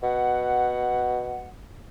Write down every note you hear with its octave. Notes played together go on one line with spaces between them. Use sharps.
B2 F#5